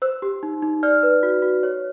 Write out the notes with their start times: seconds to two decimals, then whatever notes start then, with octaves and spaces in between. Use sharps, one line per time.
0.02 C5 E6
0.22 G4
0.43 D#4
0.62 D#4
0.83 D5 F6
1.03 B4
1.23 F#4
1.42 F#4
1.63 C#5